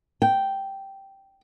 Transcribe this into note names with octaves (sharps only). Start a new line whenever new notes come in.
G5